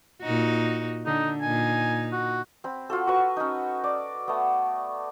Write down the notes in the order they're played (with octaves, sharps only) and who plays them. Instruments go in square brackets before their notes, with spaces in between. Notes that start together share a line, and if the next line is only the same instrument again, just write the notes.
[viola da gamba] A#2 D#4 F#4
[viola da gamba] D3 [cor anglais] D#4
[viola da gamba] A#2 D#4 [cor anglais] G#5
[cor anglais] F#4
[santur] C4 B5
F4 F#4 A4
F#4 B4 C#6
C#4 D#4
D5
A3 B3